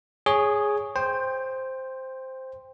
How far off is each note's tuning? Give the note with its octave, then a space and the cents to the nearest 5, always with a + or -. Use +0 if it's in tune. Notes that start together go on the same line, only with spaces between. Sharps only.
G#4 +0 C#5 +0 D#6 -30
C5 +0 G5 +20